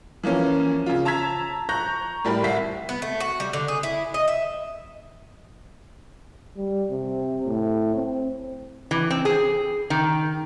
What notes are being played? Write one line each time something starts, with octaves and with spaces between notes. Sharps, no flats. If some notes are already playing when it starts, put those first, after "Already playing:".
E3 F3 A#3 C#4
C#3 F4
A5 A#5 E6 G#6 B6
A#5 C#6 F#6 G6 A#6
A2 G3 A#4 B5
C2 E5 B6 C7
B3
A3
F#4
G3
D3
G#4
E4
D#5
E5
G3
C3
A2
C4
E3
C4
G#4
D#3